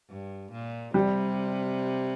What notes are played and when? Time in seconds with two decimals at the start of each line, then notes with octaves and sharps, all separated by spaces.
0.09 G2
0.52 A#2
0.94 C3 G3